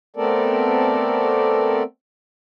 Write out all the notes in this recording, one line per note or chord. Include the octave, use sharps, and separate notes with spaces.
A3 B3 C4 A4 A#4 D5